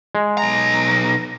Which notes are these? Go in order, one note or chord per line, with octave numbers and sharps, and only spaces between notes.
G#3
B1 A#5 A#6